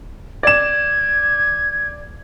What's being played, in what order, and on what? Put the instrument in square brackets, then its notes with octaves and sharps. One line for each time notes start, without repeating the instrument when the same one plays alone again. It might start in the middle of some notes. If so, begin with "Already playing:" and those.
[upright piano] D5 E7 [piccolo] G#6